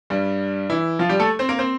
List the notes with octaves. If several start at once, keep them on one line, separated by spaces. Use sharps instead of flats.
G2 G3
E3 E4
F3 F4
G3 G4
A3 A4
C4 C5
A#3 A#4
C4 C5